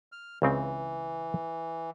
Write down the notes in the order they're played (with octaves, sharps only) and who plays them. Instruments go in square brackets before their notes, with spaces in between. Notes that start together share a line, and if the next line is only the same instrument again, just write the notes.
[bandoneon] F6
[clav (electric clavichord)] C#2 C#3 C4 [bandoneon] E3